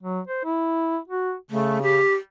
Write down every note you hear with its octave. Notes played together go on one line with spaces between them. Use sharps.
F#3
C5
E4
F#4
C#3 A3
G4